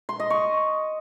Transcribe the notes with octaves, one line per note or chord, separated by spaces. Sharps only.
C6
D#5
C#6